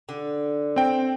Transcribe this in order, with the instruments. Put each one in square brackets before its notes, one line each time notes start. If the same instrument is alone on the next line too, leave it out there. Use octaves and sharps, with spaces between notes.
[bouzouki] D3
[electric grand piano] C4 G5